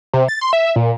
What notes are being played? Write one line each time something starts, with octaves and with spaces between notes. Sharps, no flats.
C3
A6
C6
E5
A#2